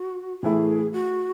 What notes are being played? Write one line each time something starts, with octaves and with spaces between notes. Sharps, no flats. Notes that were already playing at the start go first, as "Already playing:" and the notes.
Already playing: F#4
A2 E3 A3 E4 G#4
F#4